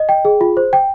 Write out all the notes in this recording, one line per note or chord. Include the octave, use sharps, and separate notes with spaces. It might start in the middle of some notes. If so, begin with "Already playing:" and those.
Already playing: D#5
G5
G#4
F4
C5
G5